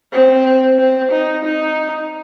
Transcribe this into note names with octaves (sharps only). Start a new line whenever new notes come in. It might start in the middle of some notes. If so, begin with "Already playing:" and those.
C4
C4
D#4
D#4